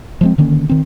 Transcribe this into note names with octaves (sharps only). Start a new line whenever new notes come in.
F3 G#3 C4
D3 D#3 A#3 C#4
D#3 C4